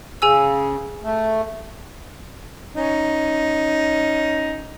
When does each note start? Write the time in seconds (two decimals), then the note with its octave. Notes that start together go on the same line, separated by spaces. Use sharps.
0.22 C#3 G#4 G#5 E6
1.04 A3
2.76 C#4 D#4